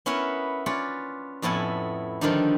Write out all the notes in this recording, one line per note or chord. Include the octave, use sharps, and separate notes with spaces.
B3 C#4 E4 A#4 B4
C#4 F4 B4 C#5 D5
F2 A2 B3 E4 G#5
D3 D#3 F3 G3 D4 D#4